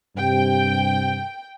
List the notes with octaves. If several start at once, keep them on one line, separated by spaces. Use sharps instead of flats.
G2 C3 G5